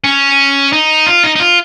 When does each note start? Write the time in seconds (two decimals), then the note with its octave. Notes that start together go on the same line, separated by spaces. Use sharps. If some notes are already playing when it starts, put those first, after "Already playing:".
0.04 C#4
0.73 D#4
1.06 F4
1.23 D#4
1.36 D#4
1.40 F4